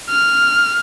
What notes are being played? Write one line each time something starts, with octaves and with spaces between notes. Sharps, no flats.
F6